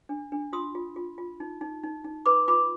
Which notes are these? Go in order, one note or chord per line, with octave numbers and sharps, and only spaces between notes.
D4
D4
F4 C6 D#6
F4
F4
F4
D#4
D#4
D#4
D#4
B4 B5 D6
F4 B5 D6